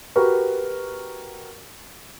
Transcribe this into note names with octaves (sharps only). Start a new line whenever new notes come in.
F#4 G4 A#4 B4 C#6